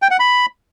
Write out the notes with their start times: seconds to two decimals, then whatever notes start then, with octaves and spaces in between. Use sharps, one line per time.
0.02 G5
0.11 F#5
0.20 B5